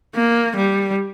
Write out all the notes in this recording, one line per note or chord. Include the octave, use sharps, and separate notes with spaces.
A#3
G3